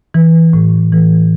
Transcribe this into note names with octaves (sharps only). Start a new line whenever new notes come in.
E3
A2
E3